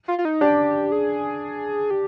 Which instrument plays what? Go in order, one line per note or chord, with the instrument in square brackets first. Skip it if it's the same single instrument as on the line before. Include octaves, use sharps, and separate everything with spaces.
[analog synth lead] F4
F4
D#4
[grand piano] D4 [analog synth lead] G4
[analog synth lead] G#4
G4